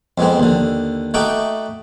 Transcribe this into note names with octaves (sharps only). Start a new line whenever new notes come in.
F2 G#3 B3 C4
D#2 D3
A3 D#4 F#4 E5 G5 D6